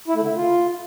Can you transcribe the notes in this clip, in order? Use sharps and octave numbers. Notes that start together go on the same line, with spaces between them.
E4
A3
D3
C#3
F4